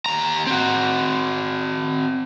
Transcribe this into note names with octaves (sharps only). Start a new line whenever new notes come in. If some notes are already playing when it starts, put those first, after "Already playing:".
D#2 A#5
C4 F#4